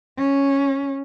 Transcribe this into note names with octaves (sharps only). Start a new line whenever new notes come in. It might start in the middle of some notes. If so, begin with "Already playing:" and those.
C#4